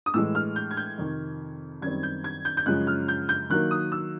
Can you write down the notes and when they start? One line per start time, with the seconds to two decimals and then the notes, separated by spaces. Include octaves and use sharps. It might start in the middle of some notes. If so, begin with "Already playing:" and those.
0.06 D#6
0.14 A2 E3 G#3 E6
0.35 F6
0.56 G6
0.71 G#6
0.77 G6
0.98 F2 C3 D#3
1.82 F#2 D#3 G3 C4 G#6
2.03 G6
2.24 G#6
2.45 G6
2.57 G6
2.66 F#2 C#3 F3 G#3 C#4 F#6
2.87 F6
3.08 G6
3.29 G6
3.50 D#3 F#3 A#3 F#6
3.71 D#6
3.92 E6